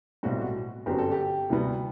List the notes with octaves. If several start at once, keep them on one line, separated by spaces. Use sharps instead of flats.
B1 A2 G3 C4 F#4
F#4
G1 F#2 D3 F#3 C4 G4
A4
G4
D2 C3 G3 B3